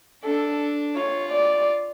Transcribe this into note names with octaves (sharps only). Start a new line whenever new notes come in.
D4 A4
F4 C#5
D5